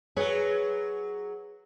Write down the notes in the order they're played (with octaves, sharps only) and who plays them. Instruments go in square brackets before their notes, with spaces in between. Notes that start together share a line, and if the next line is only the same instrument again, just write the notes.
[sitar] F#3 G#4 [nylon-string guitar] B4 C#5